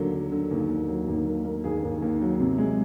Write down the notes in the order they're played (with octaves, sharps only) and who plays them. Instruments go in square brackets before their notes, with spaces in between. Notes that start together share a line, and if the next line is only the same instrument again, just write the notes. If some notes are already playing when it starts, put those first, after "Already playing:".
Already playing: [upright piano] D#2 D3 F#3 A#3
D3
D3
D#2
D#2
F#3
D#2
A#3
A#3
D#2 G#4
D#2
D#2
F#3
C3
G#3